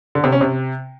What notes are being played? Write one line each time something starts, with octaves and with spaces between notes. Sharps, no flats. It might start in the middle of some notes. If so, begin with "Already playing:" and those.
D3
C3
C#4
C3